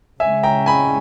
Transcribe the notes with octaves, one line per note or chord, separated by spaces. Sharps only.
C#3 G#3 C#4 E5 G#5
G5 A#5
G#5 B5